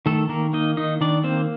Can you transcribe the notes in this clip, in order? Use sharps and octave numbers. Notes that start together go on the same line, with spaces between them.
D#3 A3 A4
D#3 A#3 A#4
A#3 D#4 D#5
D#3 D#4 D#5
D#3 D4 D5
A#3 C4 C5